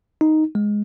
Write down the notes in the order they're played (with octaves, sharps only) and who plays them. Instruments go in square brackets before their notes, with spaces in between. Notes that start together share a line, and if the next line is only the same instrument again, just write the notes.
[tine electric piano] D#4
G#3